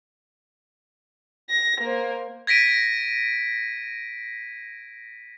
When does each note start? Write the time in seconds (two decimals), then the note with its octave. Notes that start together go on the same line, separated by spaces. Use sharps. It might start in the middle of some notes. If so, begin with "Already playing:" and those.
1.49 A#6
1.80 A#3 C5
2.47 G#6 A#6 B6 D7 D#7